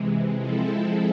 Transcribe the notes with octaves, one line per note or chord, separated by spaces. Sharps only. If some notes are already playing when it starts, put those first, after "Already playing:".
Already playing: C3 E3 G#3
F3 G#3 C4 E4 A4